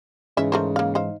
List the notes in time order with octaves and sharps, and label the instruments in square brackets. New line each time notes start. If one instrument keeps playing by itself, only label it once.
[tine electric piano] G#2 E3 G#3 [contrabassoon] C#3 [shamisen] C#4 E5
[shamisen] A3 A#4 C5
A#3 F5
D#4 C5 F5